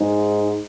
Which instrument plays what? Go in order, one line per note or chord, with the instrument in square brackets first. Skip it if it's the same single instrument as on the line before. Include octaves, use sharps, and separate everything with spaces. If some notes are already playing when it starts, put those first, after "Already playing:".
Already playing: [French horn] G#2